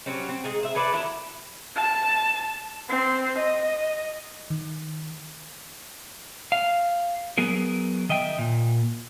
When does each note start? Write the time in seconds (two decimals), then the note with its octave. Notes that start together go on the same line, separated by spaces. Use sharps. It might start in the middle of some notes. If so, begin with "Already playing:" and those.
0.06 F#3 G3 C4 C#4
0.29 C4
0.44 G#3 D#4 G#4
0.63 C5 E5
0.75 G#4 A4 B4 D5
0.92 D#3 F#3 D4 E4
1.76 A5
2.89 C4
3.38 D#5
4.50 D#3
6.52 F5
7.38 F#3 B3 G#4 A#4
8.09 D#3 D#5 E5 G5
8.38 A#2